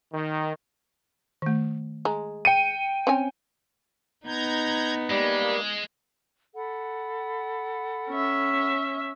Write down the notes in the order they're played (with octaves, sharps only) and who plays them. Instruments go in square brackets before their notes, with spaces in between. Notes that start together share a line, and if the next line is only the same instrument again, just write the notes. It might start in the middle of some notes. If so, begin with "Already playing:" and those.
[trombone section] D#3
[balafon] D#3 A3
[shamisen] G#3 [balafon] A#5
[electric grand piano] G5 C#7 D#7
[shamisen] C4 C#4 G#5
[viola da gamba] B3 D#4 [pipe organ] A#5 G6 G#6
[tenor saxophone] G3 [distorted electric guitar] G#3 [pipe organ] A#3
[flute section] A4 F#5 B5
[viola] C#4 E5